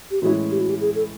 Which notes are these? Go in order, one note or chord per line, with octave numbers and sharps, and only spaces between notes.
G4
A2 E3 G#3 C#4 E4 F#4
G4
F#4
G4
G#4
A4